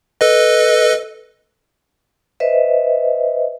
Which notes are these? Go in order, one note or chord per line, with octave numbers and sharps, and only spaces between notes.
A4 B4 D#5
B4 C5 D#5 E5